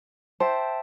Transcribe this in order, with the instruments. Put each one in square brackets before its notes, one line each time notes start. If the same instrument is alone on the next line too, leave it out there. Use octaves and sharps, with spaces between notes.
[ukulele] C5 [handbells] E5 G5 A5